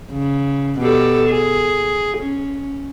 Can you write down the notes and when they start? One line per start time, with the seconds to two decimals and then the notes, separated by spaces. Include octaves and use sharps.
0.12 C#3
0.80 B2 G4 A4
1.29 G#4
2.18 C#4